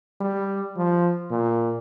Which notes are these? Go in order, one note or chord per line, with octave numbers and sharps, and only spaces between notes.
G3
F3
A#2